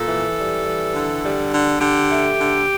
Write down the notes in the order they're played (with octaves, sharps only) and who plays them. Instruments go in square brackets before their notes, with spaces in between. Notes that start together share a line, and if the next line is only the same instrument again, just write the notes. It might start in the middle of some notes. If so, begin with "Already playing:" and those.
Already playing: [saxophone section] A#2 A4
E3
G3
E3
D3
G3
D3
D3 G4
A3
D3